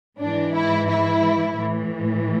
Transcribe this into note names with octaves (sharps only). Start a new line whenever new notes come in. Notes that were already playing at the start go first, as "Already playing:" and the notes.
G#2 E3 D4
E4
E4
A2 E3